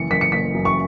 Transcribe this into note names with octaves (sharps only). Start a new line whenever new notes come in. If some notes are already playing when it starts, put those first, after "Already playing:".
Already playing: F#1 E3 C#7
F#1 B6
C#7
F#1 B6
F#2
C#6